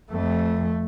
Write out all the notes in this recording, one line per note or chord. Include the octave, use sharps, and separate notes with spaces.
F2 A3